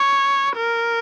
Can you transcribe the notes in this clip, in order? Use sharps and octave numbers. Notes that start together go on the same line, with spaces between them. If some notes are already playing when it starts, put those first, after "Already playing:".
Already playing: C#5
A#4